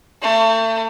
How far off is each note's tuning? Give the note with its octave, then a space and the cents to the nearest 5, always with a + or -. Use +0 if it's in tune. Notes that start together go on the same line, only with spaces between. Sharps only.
A3 +35